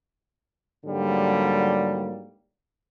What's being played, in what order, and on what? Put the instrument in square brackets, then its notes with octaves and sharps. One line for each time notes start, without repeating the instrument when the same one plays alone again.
[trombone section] G#2 D3 F#3 G3 A#3